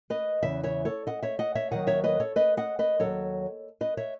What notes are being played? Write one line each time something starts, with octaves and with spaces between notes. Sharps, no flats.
B4 D#5
E2 C#3 E3 E5
C#5 E5
A4 C#5
D#5 F#5
C#5 E5
D#5 F#5
C#5 E5
D#2 D#3 F#3 D#5 F#5
C#5 E5
B4 D#5
A4 C#5
B4 D#5
D#5 F#5
B4 D#5
D#2 C#3 F#3 A4 C#5
B4 D#5
C#5 E5